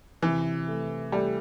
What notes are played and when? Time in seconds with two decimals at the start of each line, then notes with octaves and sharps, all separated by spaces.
0.23 C3 E3
0.68 A3
1.12 G3 A3